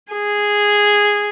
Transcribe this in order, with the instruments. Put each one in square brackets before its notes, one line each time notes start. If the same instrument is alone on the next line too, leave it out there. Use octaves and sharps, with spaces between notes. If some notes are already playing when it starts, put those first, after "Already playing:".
[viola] G#4